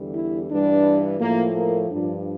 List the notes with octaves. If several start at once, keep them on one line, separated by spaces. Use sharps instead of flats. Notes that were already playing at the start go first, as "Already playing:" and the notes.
Already playing: E2 D3 G3
E4
G2 E3 G3 D4
A2 F3 A#3
A#3
G2 F3 D4